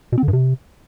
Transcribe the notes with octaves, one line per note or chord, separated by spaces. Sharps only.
B2
C4
D3
G2
C3